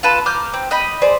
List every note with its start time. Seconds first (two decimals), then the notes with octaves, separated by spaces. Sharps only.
0.03 F4 A4 B4 A5
0.26 A#5 D6 F6 G6
0.54 C4
0.71 D#5 G5 B5
1.02 G#4 C5 D5